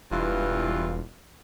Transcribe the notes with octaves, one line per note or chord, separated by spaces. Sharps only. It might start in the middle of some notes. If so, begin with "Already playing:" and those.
E1 G2 E3 F4